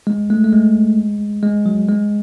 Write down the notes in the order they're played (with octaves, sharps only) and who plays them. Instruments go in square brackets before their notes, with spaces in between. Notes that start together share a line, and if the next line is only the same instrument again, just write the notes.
[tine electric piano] G#3
A3
A3
G#3
G#3
F#3
G#3